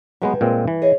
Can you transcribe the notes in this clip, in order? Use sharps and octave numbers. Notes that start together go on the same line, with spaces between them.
G2 F#3 G#3 B3 B4 E5
A#2 G#3 C4
E3
G#4 C#5 D#5